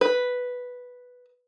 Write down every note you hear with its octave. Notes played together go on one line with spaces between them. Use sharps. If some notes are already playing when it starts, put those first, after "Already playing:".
B4